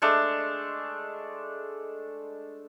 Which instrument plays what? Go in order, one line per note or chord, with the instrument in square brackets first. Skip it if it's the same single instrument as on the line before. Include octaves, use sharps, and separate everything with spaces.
[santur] G#3 A3 D4